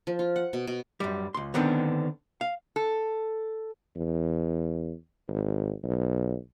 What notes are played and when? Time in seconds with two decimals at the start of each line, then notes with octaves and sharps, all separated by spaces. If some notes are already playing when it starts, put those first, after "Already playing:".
0.07 F3
0.19 F4
0.36 F#5
0.53 B2
0.67 B2
1.00 F#2 G3
1.34 C#2 C6
1.54 D3 D#3 B3 C4 D4
2.41 F5
2.76 A4
3.96 E2
5.28 G#1
5.84 B1